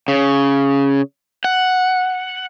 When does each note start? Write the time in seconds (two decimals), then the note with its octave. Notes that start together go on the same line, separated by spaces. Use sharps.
0.08 C#3
1.44 F#5